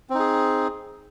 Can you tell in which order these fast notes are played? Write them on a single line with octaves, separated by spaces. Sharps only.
C4 D#4 G#4